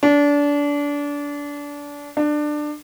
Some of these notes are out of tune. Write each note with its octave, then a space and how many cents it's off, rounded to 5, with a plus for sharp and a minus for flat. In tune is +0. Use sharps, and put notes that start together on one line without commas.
D4 -25
D4 +20